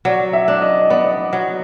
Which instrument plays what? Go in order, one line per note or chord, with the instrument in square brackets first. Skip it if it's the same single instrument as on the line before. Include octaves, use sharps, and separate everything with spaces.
[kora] F#3 [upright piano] D5
[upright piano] E5
[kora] D4
[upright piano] D#5
[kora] B3 [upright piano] D5
[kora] F#3